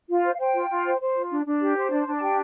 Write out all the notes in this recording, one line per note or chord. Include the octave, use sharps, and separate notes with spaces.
F4
C5
F5
C5 G5
F4
F4
C5
C5
F4
D4
D4
G4
C5
D4
D4
A5
G4 G5